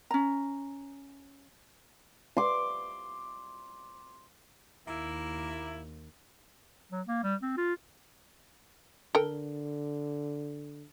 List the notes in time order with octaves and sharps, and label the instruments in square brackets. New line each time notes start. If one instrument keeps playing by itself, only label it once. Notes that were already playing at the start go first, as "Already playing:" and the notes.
[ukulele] C#4 A#5
[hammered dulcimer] C6 D6
[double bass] D#2 [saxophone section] A#3 E4
[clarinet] F#3
A#3
G3
C4
F4
[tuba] D3 [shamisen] A4 A#4 G5